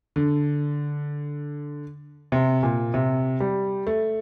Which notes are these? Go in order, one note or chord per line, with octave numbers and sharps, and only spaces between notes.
D3
C3
A#2
C3
G3
A3